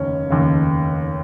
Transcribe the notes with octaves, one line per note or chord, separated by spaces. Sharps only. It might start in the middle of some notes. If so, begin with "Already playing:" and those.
Already playing: F1 D#2 C#3 C#4
F1 D#2 C#3